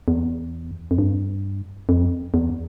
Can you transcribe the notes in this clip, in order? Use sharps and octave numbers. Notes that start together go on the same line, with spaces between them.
E2
F2
G2
F2
E2